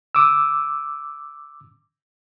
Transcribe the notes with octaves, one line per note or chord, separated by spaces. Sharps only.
D6 E6